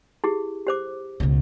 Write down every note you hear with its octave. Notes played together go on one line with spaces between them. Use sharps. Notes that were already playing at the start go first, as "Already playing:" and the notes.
E4 G4 G#4
G4 C5 D6
C#2 B2